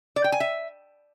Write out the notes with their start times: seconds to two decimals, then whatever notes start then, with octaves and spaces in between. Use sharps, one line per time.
0.16 D5
0.24 G5
0.32 G#5
0.40 E5